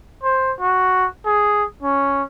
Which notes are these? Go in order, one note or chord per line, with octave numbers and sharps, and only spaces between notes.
C5
F#4
G#4
C#4